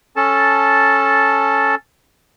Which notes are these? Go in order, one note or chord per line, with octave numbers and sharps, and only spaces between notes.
C#4 A4 A5